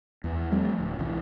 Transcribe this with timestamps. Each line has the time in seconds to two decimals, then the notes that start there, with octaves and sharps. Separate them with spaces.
0.24 E2
0.52 F3 G3 A3 C4
0.78 D1
0.99 B1 E3